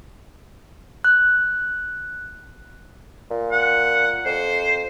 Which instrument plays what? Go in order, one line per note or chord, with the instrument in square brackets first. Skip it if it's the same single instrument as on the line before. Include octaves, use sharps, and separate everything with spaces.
[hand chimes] F#6
[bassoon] A#2
[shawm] F#5
[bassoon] F2 [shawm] C5